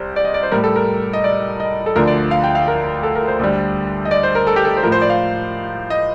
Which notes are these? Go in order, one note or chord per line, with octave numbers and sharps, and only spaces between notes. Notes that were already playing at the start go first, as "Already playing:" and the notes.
Already playing: C2 C5
D5
D#5
D5
C5
A2 G3 A#4
A4
A#4
D#5
D5
D#5
A4
D2 D3 F3 A#4
D5
F5
G5
F5
A#4
A4
A#4
C5
D2 D3 G3
D#5
D5
C5
A#4
A4
G4
A4
C5
A2 F3 A#4
C5
D5
F5
D#5